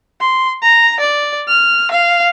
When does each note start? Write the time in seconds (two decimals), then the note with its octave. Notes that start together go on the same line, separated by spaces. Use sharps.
0.20 C6
0.62 A#5
1.00 D5
1.47 F6
1.91 F5